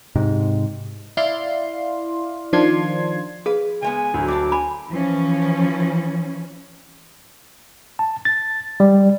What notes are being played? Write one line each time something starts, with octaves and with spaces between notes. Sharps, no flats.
G#2 C3
E4 D5 F5 C6
D#3 F3 D4 F4 C6 G#6
G#4 B4 F5
C#3 G#3 B3 G#5
D2 F#3
G3 D4 A5 D6
G#5 B5
E3 F3 C#4
A5
A6
G3